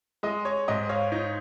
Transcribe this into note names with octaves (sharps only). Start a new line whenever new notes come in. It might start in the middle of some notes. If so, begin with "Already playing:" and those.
G#3 D#5
C#5
G#2 D#5
C#5 F5
D#4 C#5